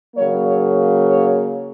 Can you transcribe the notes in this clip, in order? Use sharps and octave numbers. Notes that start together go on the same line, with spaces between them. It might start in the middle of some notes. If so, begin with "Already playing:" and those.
C#3 F#3 A#3 C#5
C#5
C#5